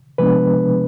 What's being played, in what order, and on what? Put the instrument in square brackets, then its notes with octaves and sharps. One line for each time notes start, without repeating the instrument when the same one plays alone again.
[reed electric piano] C3 F3 G#3 B3 D4 B4